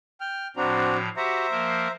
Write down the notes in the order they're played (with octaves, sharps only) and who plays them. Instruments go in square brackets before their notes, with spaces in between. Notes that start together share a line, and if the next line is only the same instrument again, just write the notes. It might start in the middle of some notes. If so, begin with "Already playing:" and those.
[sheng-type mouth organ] G5 F6
[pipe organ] A2 F3 A#5 [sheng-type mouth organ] C4 D4 F#4
[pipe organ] F#4 G4 F#5 [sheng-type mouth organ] C5 E5 A#5
[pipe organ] F3 A#3 A#4